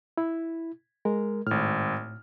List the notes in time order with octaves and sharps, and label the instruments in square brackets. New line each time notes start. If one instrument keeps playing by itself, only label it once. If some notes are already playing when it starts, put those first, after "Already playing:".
[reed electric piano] E4
G#3 A#4
[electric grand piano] G#1 F6 [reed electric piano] A2